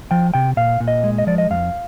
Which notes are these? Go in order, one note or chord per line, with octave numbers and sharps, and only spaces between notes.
F3 G5
C3 G5
A#2 F5
A#2
D#5
G#3
D#5
F3 D5
D#5
F2 F5